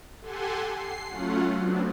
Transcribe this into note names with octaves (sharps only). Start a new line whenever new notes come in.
G4 A4 F#5 G#5 C6
C7
F#3 A3 C#4 F4 F#5
F#3 B3 C4 D4